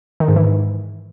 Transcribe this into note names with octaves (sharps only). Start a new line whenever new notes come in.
D#3
G#2
E3
G#2